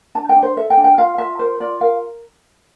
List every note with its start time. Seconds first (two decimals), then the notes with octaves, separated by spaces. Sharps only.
0.15 D4 A5
0.29 G5
0.36 D4
0.43 C5
0.57 A4 E5
0.70 G5
0.77 D4
0.84 G5
0.98 F4 F5
1.18 F4 E5
1.39 A#4 C5
1.60 F4 D5
1.80 A#4 F5